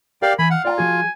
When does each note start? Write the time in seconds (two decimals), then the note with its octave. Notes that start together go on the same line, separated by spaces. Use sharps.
0.22 G4 A#4 D5 F5
0.39 E3 G#5 B5
0.50 F5 F#5
0.65 F4 D5 G5 A#5
0.78 F3 F#4 G#4 G#5